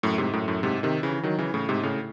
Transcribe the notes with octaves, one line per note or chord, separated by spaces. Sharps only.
F#2 A2
G#2 C3
F#2 A2
F#2 A2
G#2 C3
C3 D#3
C#3 E3
D#3 F#3
C#3 E3
A2 C#3
G#2 C3
A2 C#3